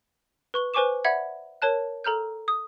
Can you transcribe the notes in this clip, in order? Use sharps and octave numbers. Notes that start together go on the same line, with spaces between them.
B4 C#6 G7
B4 C5 G#5 C#6 D6 E7
D5 E5 F#5 B5 G#6
A#4 C#5 A5 F#6
A4 A#5 F6 G6
D#6